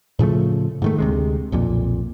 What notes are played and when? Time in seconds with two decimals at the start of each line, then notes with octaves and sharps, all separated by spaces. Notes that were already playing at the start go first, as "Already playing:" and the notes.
0.19 A2 C#3 F3 A3
0.82 G#2 D#3 A3
0.98 D2 C3 G#3
1.52 B1 F2 A#2